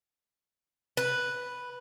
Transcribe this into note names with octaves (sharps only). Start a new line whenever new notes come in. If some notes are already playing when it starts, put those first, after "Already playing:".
B4